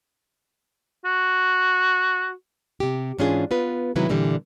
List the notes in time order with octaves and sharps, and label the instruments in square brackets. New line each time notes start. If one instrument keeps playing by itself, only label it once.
[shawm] F#4
[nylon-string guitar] C3 G4
G#2 E3 C#4 D4 F4 G#4
B3 F4 B4
C3 D#3 F#3 G#3 E4 B4
A#2 D3 E3 G3